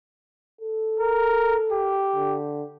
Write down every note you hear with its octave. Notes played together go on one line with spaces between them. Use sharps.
A4
A#4
G4
D3